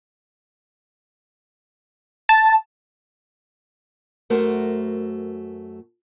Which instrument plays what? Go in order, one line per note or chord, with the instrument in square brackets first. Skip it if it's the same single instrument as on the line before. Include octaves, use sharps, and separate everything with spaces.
[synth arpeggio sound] A5
[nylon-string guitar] F#2 A3 F#4 A#4 C5